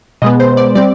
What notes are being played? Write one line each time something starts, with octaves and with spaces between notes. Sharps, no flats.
B2 G#3 B3 D#5
C5
D5
G3 C4 D5